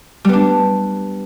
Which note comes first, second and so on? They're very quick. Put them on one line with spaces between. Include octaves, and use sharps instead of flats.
G3 B3 D4